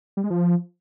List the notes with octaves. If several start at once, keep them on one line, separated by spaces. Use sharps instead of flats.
G3
G#3
F3